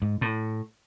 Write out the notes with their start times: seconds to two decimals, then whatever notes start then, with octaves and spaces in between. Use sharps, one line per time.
0.02 G#2
0.21 A2